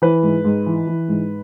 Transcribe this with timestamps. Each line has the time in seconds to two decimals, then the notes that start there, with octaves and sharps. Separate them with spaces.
0.02 E3 B4
0.23 G#2
0.45 G#2
0.66 E3
0.87 E3
1.09 G#2